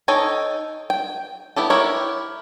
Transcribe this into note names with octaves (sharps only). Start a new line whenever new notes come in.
D#4 A4 C#5 G5 G#5
G5
B3 E4 G4 A4
E4 G4 A#4 C#5